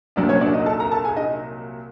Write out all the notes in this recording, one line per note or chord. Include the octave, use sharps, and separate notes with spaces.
C2 A#2 F#3 D4 D5
C#4 C#5
D4 D5
D#4 D#5
A4 A5
A#4 A#5
A4 A5
G#4 G#5
D#4 D#5